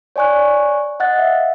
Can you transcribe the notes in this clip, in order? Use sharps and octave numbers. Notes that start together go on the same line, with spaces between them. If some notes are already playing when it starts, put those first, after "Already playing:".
C#5 D5 G#5 C#6 F#6
D#5 F#5 F#6 A6
E5 F5